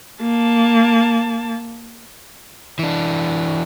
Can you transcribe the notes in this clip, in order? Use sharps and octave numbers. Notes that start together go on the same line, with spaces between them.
A#3 A5
E3 D4